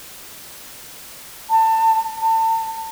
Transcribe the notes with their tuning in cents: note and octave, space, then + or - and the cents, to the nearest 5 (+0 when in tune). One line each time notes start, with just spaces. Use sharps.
A5 +25
A5 +35